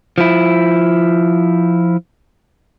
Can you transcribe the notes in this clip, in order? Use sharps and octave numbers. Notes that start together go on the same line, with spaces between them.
F3 E4